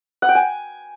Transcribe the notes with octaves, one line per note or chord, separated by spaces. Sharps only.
F#5
G5
G#5